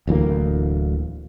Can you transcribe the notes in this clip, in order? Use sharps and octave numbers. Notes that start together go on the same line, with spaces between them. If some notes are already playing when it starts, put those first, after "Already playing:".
D1 D2 E3 A#3